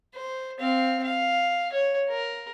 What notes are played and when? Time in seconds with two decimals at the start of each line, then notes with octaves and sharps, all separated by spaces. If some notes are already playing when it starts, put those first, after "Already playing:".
0.14 C5
0.59 C4 F5
1.03 F5
1.73 C#5
2.10 A#4